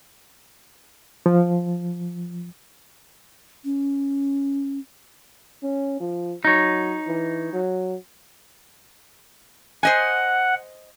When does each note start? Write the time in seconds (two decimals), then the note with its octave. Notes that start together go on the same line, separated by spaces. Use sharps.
1.26 F3
3.65 C#4
5.63 C#4
6.00 F3
6.45 F#3 D#4 C#5
7.07 E3
7.53 F#3
9.83 C5 D#5 F#5 G#5